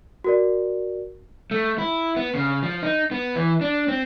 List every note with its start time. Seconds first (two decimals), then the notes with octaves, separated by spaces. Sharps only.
0.24 F#4 A#4 D5
1.51 A3
1.78 E4
2.16 B3
2.35 C#3
2.63 F3
2.83 D#4
3.11 B3
3.36 E3
3.61 D4
3.88 C4